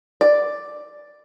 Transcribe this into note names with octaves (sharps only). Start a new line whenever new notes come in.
D5